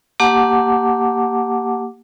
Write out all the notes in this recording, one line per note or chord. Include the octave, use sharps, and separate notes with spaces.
A#3 G4 F#5 A5 D6